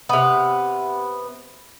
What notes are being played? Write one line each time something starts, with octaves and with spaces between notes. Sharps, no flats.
C3 B3